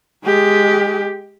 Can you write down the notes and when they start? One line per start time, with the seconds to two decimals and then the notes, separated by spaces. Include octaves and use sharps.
0.24 G#3 G4